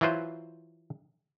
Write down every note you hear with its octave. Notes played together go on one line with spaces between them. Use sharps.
E3 F#3 E4 F4 B4 C5